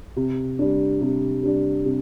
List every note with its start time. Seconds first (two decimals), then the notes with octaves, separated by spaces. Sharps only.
0.16 C3
0.59 G3 D4
1.01 C3
1.43 G3 D4
1.85 C3